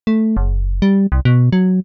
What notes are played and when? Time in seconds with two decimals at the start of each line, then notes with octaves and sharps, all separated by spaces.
0.07 A3
0.37 F#1
0.82 G3
1.12 C2
1.25 B2
1.53 F#3